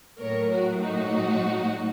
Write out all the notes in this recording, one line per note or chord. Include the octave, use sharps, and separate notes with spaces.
A2 F#3 A#4 C#5
F#4 A#4
D#4 F#4